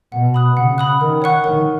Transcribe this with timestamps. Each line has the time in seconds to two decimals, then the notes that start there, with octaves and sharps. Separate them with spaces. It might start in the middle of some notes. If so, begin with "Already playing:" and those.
0.12 B2 F#5
0.34 B5 D#6 F#6
0.57 C#3 F#5
0.78 B5 D#6 F#6
1.00 D#3 A#4
1.22 C#5 F#5 C#6 F#6
1.44 D#3 A#4